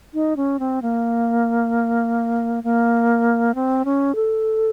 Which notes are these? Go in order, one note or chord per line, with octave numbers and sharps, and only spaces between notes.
D#4
C#4
C4
A#3
A#3
C4
C#4
A4